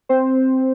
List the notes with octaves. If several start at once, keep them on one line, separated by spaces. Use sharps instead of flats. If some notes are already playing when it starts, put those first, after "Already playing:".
C4 C5